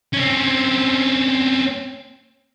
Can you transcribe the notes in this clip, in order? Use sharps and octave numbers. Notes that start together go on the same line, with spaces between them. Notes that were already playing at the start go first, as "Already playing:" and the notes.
C4 C#4